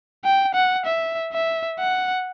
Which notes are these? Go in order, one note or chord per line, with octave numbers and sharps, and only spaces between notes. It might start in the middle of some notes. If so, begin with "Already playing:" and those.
G5
F#5
E5
E5
F#5